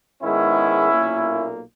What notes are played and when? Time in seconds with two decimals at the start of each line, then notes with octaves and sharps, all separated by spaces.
0.22 G#2 D#3 G#3 B3 C#4 E4
0.92 B1 A#2 A#3